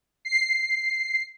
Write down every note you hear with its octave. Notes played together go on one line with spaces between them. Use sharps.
C7